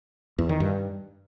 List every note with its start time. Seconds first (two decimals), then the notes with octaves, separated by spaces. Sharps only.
0.39 E2
0.49 D#3
0.60 G2